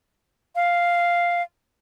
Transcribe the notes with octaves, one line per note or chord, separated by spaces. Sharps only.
F5